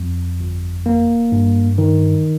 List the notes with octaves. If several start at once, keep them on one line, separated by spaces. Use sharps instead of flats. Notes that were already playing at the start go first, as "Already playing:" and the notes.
Already playing: F2
G1
A#3
G2
D#3